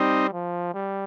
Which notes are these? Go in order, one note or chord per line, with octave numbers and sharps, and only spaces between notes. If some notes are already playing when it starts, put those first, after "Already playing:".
Already playing: G3 C4 D#4
F3
G3